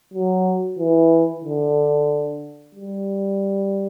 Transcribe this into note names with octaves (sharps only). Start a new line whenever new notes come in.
F#3
E3
D3
G3